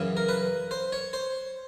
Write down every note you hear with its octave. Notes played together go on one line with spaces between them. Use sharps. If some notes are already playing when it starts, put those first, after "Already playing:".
Already playing: F#2 C#3 E3
A#4
B4
C5
C#5
C5